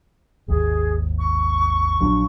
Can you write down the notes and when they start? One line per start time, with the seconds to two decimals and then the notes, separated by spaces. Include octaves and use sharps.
0.48 G#1 D#2 G#4
1.19 C#6
2.00 A#1 F#3 D4